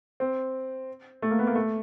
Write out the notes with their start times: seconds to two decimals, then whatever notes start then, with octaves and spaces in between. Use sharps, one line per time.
0.20 C4
1.22 A3
1.31 A#3
1.39 B3
1.47 A#3
1.55 A3